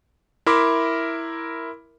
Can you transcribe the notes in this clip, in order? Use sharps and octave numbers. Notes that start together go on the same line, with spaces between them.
E4 A#4 E5 B5 C6 D6